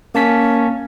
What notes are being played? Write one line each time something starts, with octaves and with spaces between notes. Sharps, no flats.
A#3 C#4 A5 B6